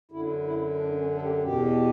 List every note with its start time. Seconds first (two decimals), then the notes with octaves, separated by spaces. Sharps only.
0.11 F#2 D3 E4
0.45 E4
0.77 D4
0.99 C#4
1.15 A4
1.22 G4
1.43 E2 B2 G4